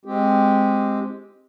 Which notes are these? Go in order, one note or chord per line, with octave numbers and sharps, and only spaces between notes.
G#3 C4 G4